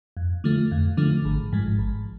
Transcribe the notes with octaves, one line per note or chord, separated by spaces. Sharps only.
F2
D3 F3 A3
F2
D3 F3 A3
G#1
G#2 F3 G#3
G#1